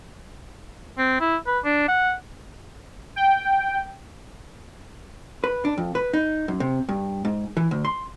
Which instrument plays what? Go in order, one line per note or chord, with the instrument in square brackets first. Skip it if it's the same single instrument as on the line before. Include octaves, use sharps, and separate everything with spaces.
[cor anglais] C4
E4
B4
D4
F#5
[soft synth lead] G5
[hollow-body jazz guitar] B4
D4
F2
B4
D#4
F#2
C3
G2
G#2
E3
D2
C6